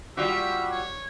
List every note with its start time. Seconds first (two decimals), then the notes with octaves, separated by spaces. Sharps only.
0.17 G3 F4 F#4 E5
0.71 C#5